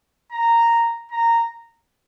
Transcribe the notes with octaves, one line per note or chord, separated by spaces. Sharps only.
A#5
A#5